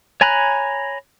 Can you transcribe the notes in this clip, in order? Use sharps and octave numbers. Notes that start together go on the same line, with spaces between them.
C#5 G#5 A#5 B5 F#6